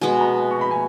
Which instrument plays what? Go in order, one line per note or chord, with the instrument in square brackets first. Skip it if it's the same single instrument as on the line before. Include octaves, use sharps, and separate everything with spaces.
[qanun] B2 G#3 B3 F#4 [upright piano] G#5
[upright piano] A#5
C#6
B5
G#5